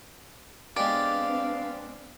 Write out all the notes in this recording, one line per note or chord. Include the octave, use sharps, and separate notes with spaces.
G#3 B3 C4 D4 G4 D5 F5